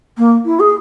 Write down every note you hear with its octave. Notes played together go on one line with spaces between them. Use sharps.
A#3
E4
G#4